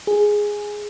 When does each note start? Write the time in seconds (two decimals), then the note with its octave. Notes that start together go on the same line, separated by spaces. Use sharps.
0.07 G#4